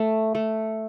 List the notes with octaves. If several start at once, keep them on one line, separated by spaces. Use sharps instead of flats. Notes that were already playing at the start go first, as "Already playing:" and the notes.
Already playing: A3
A3